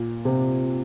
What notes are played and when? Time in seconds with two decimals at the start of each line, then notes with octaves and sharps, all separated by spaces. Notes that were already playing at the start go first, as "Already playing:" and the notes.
Already playing: A#2
0.25 C3